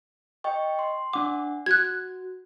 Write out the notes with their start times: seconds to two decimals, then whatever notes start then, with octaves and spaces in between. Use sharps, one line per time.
0.44 D#5 G5 C#6
0.79 C6
1.13 D4 F#5 D6
1.66 F#4 F#6 G#6